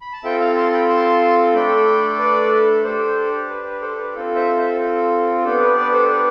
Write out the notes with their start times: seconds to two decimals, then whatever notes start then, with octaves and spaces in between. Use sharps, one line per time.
0.01 B5
0.13 A5
0.24 C4 F4 A4 E5 G5
0.40 F5 A5
0.57 A5 C6
0.73 G5 B5
0.89 A5 C6
1.54 A3 D4 A4 G5 B5
2.19 B4 D5
2.84 D4 G4 A4 C5
3.49 B4
3.66 B4
3.81 A4 C5
3.98 B4
4.14 C4 F4 A4
4.35 C5 E5
4.57 C5 E5
4.79 A4
5.44 B3 D4 G4 A4
5.60 B4
5.76 B4 D5
5.92 A4 C5
6.09 B4